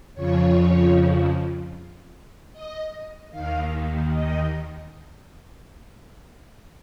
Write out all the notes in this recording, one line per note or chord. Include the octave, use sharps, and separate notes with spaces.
F2 C#3 F3 C#5
D#5
D#2 D#3 F5
D#5